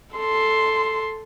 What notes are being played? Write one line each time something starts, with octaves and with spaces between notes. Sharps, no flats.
A4 C6